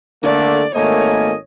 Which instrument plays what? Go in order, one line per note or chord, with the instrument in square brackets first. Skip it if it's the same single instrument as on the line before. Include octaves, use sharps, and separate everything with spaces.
[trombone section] D3 A3 A#3 [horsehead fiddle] D5
[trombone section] G#1 A3 [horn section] A#3 D#5 G#5 [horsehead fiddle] C#5